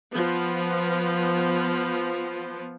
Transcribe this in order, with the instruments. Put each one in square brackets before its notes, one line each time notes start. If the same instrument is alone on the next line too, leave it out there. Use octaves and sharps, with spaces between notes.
[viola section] F3 B3